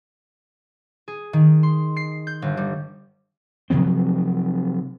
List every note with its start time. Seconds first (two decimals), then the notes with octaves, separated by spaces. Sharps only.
1.08 G#4
1.33 D#3
1.63 C6
1.97 C7
2.27 G6
2.42 G1
2.57 G3
3.70 C3 F3 F#3 C4